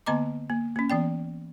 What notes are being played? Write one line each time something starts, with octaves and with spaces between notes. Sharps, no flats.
D3 A#3 B3 D#5 A#5 D6
A#3
A#3 C#4
E3 B3 D5 G5